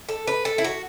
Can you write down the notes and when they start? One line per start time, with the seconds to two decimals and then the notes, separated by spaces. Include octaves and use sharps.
0.09 A4
0.27 B4
0.45 A4
0.58 E4
0.64 F#4